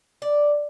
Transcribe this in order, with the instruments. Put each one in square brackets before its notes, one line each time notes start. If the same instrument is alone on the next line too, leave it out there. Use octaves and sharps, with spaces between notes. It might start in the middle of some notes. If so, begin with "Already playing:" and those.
[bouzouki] D5